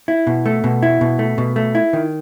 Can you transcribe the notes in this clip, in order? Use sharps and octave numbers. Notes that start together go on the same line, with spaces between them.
E4
B2
A3
B2
E4
B2
A3
B2
A3
E4
D#3